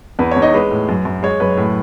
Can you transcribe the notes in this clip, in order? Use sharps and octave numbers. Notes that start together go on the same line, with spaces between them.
E2 B4
E2 C#5
D#4 D#5
G#3 B4
A2
F#2
F#2
G#3 C#5
F#2 B4
A2